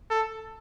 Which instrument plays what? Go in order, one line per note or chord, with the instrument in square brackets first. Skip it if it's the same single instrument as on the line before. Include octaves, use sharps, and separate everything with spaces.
[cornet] A4